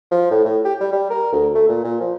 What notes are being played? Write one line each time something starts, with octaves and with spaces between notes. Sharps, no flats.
F3
A2
A2
G4
G3
G3
A#4
D2
A3
A#2
A#2
F3